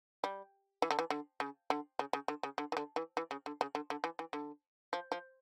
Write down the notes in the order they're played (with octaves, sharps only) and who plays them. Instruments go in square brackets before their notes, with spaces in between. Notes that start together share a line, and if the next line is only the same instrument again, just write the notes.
[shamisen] G3
E3
D3
E3
D3
C#3
D3
C#3
C#3
D3
C#3
D3
E3
D3
E3
E3
C#3
D3
C#3
D3
D3
E3
E3
D3
F3
F3